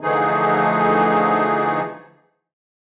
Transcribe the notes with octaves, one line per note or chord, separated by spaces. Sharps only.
D3 E3 F3 A3 D#4 G#4